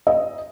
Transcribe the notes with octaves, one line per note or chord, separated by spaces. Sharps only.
D#5